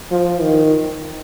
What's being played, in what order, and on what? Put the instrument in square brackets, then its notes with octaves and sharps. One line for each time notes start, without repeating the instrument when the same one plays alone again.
[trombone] F3
D#3